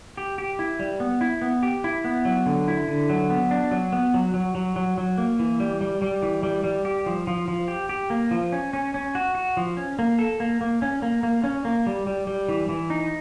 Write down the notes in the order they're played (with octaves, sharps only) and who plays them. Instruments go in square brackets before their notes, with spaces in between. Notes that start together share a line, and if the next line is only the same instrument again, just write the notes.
[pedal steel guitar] G4
G4
E4
G3
B3
E4
B3
G4
E4
B3
F#3
D3
E4
D3
F#3
B3
D4
F#3
B3
F#3
F#3
F#3
F#3
F#3
A#3
E3
G3
G3
G3
E3
G3
G3
G4
F3
F3
F3
G4
G4
A#3
F3
C#4
C#4
C#4
F#4
F#4
F3
C#4
A#3
A4
A#3
A#3
C#4
A#3
A#3
C#4
A#3
G3
G3
G3
E3
E3
D#4